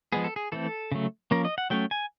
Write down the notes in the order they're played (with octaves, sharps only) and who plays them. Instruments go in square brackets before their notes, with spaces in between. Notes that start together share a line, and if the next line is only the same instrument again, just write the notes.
[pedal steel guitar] F3 G#3 B3 G#4
A4
G#4
E3 A3 C4 A4
C#3 F#3 A3
F3 A#3 C#4 A#4
D#5
F#5
F#3 A3 C#4 G5
G#5